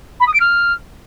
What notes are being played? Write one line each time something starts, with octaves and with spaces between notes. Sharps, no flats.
B5
D#6
D7
F6